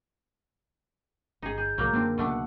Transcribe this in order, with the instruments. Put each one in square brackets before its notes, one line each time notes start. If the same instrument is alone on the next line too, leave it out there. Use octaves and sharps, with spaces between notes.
[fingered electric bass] G1 [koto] D#4 G#4
[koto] G#4 [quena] G6
[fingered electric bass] C2 A2 F3 [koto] F#3 A#3
[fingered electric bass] F#2 D#3 [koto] D3 C4 D4 [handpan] A#3
[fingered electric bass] C#2 F#3 [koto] B2 A3 D4 [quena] F#5